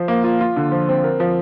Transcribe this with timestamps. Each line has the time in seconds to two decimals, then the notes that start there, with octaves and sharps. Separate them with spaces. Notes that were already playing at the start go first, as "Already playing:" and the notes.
Already playing: F3 C5
0.08 A#3
0.24 F4
0.41 F4
0.56 D3
0.72 F3
0.89 C4
1.04 A#4
1.20 F3